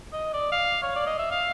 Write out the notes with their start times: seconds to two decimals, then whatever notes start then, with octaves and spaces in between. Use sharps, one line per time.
0.13 D#5
0.33 D5
0.52 F5
0.83 C#5
0.96 D5
1.07 D#5
1.18 E5
1.31 F5